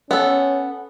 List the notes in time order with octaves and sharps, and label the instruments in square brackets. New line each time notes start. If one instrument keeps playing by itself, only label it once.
[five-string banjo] B3 A4 [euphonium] C#4